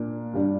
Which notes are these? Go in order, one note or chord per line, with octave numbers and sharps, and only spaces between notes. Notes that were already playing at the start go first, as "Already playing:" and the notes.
Already playing: A#2 A#3 D4
G2 G3 D4